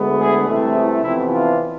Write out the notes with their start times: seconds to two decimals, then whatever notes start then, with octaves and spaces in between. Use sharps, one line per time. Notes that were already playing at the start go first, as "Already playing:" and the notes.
Already playing: D2 D3 G#3 B3
0.19 E4 G#4
0.46 C2 C3 E3 A3
0.74 E4 G#4
1.03 F2 C3 E3 B3 E4
1.32 D4 F4